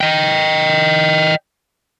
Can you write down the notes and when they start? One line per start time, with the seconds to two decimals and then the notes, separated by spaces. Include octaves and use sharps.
0.01 D#5 G5